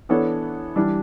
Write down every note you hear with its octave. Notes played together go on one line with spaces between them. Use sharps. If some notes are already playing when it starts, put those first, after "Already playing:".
E3 B3 D4 A4 C#5
E3 G3 D4